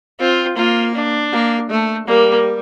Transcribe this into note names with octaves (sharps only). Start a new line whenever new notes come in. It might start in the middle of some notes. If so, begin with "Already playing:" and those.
C4 F4
A#3 F4
D4
A#3
A3
G3 A#3